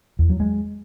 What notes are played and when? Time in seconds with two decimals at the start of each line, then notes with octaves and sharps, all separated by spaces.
0.19 E2
0.29 F#3
0.40 G#3